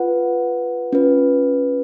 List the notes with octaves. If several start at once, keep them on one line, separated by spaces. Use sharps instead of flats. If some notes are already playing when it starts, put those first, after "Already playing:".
Already playing: F4 B4 F#5
C#4 F4 B4